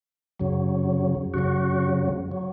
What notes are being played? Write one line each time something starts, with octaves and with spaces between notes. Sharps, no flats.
F#2 C#3 F#3
F#2 C#3 F#3 F#4
F#3